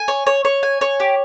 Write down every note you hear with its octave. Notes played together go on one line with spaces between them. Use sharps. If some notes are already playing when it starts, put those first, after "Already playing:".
Already playing: G#5
C#5
C#5
C#5
G#5
C#5
G4